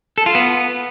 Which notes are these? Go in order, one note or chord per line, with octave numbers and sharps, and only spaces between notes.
A4
F4
B3